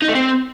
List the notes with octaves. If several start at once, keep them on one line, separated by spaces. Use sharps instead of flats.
D#4
A3
C4